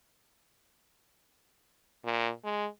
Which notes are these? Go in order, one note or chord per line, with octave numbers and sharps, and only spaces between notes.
A#2
G#3